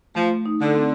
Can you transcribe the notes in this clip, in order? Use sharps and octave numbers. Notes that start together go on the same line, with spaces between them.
F3 A3
D#4
D3
C4